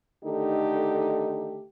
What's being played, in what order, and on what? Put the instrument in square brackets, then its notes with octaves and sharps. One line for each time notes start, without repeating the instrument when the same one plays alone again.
[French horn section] D3 D#3 A3 D#4 G4